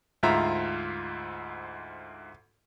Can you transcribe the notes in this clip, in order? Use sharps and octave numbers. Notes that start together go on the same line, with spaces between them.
D2 G#2 F4 E5 A#5